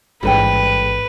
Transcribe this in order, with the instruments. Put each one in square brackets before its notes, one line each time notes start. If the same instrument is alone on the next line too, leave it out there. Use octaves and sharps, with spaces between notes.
[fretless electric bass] A1 G#2 [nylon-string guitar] G3 A4 G5 [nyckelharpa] B4